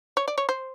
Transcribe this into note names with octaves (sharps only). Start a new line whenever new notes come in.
C#5
D5
C#5
C5